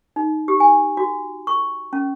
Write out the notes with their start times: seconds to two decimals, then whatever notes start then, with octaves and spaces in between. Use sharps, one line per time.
0.16 D#4
0.48 G4
0.60 G#5
0.97 F#4
1.47 C#6
1.93 C#4